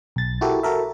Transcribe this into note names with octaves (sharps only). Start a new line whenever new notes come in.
B1 A6
E4 F#4 G4 A4 A#4
F#4 A4 A#4 E5